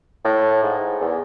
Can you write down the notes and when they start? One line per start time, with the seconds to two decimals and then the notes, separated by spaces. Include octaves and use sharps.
0.25 A2
0.63 G#2
1.01 E2